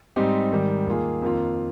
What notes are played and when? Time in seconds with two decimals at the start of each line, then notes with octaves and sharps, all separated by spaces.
0.16 G#2 G3 C4 D#4 G4
0.52 G#2 D#3 G3
0.86 D#2 D#3 A#3 F4 G#4
1.22 F2 D#3 A#3 F4